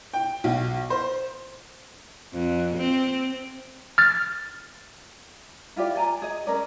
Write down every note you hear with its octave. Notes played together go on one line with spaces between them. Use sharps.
G5
B1
C5
F2
C4
F6 A6
E4 F4 G4 D5
D5 G#5 A#5
G#4 D#5
C#4 A#4 D5